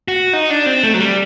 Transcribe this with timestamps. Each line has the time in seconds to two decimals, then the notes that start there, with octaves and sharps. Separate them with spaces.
0.08 F#4
0.33 D#4
0.50 D4
0.66 C4
0.84 A3
0.94 F#3
0.99 G3